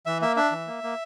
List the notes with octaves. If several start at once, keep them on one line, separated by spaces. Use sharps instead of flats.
E3 E5
A#3 E5
D4 E5
E3
A#3
A#3